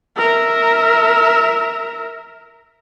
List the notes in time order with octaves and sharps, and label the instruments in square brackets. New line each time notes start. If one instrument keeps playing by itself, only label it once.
[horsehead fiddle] A#4 E5